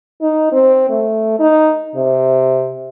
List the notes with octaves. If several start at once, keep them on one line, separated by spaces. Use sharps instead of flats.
D#4
C4
A3
D#4
C3